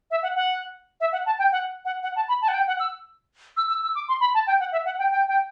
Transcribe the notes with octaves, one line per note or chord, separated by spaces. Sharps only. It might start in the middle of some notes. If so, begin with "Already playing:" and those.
E5
F#5
F#5
E5
F#5
A5
G5
F#5
F#5
F#5
A5
B5
A5
F#5
G5
F#5
E6
E6
E6
E6
D6
C6
B5
A5
G5
F#5
E5
F#5
G5
G5
G5